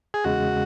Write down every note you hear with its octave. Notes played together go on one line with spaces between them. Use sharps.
G#4
E2 C#3 G#3 F#4